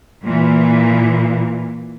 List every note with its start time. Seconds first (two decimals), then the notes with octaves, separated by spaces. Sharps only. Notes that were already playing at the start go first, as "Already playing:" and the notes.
0.23 A#2 E3